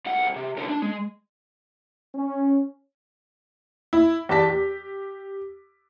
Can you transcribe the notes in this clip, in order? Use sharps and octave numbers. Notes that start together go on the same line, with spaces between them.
C2 F#5
C3
C2 D3
D4
G#3
C#4
E4
E2 G4 D5 A5 B6
G4